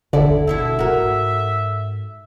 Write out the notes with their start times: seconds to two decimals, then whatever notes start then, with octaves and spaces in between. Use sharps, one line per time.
0.13 G1 D#2 D3 E4 A4 D5
0.47 B2 E4 A4 E5
0.79 G#2 F#4 A#4